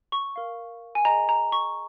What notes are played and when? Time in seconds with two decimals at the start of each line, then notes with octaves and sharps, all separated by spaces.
0.12 C#6
0.36 A#4 F5
0.95 G#5
1.05 G#4 D#5 A#5
1.29 A#5
1.52 C#6